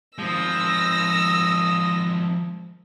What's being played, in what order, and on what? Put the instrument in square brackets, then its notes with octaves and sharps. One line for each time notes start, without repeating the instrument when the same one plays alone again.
[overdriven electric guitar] F3 [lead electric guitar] G#3 C4 [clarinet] D#6 [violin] E6 A#6